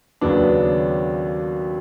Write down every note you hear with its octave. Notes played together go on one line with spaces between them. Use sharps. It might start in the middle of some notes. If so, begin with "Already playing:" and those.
D#2 C#3 F#3 B3 D4